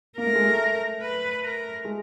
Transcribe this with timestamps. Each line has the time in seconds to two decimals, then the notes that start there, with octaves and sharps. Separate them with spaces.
0.18 A#3 A#4
0.27 A3
0.35 G#3
0.45 A3
1.01 B4
1.43 A#4
1.85 G#3